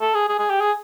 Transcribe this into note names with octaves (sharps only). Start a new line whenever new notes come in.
A4
G#4
G#4
G#4
G4
G#4